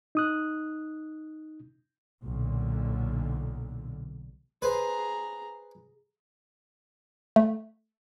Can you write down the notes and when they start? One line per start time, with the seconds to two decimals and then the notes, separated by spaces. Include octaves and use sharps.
0.15 D#4 D#6 F#6
2.23 B1 A#2 D3
4.62 G#4 B4 C5 A#5
7.36 A3